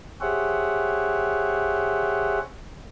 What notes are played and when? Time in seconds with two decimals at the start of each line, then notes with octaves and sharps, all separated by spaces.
0.21 G4 G#4 C5 C#5 E5 F#5